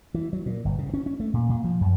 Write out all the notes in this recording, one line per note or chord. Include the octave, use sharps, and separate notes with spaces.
E3
F#3
A#2
G1
C#3
C#4
C#4
A3
A#2
A#2
F3
F#2